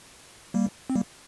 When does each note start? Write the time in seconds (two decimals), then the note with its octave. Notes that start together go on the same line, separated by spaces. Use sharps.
0.54 G3 A#3
0.90 C4
0.96 G3 A#3